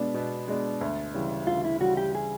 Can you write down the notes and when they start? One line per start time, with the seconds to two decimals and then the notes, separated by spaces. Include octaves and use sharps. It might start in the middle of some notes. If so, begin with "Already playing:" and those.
Already playing: B2 G#3 B3 D4
0.14 B2
0.48 G#3 B3 D4
0.81 D2
1.14 C#3 E3 G3
1.47 D2 F4
1.64 E4
1.81 C#3 E3 G3 F#4
1.97 G4
2.15 G#4